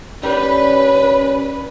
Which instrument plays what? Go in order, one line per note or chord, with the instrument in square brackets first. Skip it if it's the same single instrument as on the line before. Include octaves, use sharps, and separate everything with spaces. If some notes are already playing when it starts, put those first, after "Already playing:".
[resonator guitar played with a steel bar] G3 [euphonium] C#4 [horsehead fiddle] B4